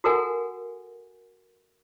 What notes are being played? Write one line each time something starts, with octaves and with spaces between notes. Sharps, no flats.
F#4 A4 A#4 F#5 G#5